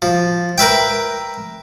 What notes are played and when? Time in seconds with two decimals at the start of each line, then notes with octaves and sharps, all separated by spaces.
0.02 F3
0.58 A#4 B4 E5 G5